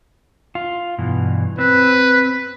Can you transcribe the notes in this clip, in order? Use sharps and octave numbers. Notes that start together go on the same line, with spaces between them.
F4
G2 B2 E3
C4 B4